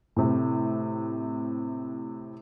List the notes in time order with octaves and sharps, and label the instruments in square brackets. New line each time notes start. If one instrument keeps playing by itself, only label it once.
[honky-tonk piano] A2 C3